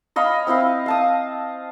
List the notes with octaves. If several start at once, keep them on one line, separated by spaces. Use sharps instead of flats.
C#5 D#5 F5 B5
C4 E4 D#5 F5
F5 A5 D#6